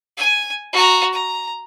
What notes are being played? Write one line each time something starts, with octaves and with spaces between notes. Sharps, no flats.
G#5
F#4 A#5
A#5